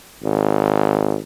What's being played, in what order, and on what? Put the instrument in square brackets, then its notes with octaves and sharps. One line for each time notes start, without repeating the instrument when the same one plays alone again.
[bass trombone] G#1